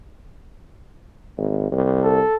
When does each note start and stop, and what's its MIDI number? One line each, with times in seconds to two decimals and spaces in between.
1.37 1.69 32
1.71 2.20 36
2.03 2.36 69